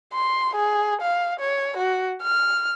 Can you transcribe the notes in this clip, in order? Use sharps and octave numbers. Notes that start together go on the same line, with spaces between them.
C6
G#4
F5
C#5
F#4
F6